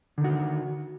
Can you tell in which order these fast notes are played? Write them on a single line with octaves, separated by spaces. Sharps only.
D3 D#3 F#4